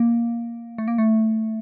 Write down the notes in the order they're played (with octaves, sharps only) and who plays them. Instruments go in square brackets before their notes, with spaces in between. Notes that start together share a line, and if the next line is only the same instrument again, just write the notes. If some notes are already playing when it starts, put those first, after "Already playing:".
Already playing: [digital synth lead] A#3
A3
A#3
A3